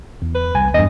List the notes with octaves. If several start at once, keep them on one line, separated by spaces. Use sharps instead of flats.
E2
B4
C2 G#5
E2 G2 D#5